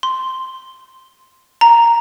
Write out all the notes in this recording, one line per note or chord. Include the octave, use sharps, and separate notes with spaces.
C6
A#5